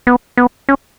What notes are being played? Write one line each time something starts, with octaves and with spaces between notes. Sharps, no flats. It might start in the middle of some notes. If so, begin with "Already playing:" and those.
B3
B3
C#4